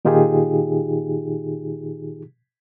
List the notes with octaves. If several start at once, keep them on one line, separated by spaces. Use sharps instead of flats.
A#2 D#3 D#4 F4 G4 G#4